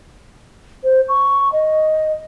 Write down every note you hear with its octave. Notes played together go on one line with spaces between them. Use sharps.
C5
C#6
D#5